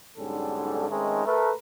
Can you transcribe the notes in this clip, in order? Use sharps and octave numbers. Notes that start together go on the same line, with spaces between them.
B1 G#2 D3 G3 C#4 A4
D#3 G#3 A3 C4 C#4 D#4
A3 A#4 B4